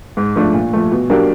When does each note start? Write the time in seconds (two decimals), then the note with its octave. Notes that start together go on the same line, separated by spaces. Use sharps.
0.17 G#2
0.36 F3 A3 D4
0.54 A#2
0.73 F3 A3
0.92 B2
1.10 F#3 A#3 D4 G4